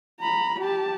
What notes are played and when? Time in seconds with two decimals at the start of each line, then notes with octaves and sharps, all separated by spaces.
0.20 A#5 B5
0.60 G4 A5